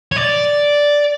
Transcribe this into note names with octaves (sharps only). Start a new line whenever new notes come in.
C#5
D5